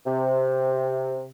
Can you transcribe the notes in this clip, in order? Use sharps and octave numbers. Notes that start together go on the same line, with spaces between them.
C3